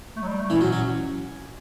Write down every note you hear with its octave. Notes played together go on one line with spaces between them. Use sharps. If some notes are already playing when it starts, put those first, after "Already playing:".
A3
F#3
G3
A3
E3 C#4
F#3
F#3